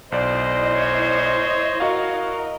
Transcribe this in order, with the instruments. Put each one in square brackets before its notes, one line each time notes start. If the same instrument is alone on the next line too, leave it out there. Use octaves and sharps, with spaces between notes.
[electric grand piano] B1 D5 [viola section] E4 D#5 [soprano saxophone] C5
[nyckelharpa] C#5
[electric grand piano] F#4 F5 [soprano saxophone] A#4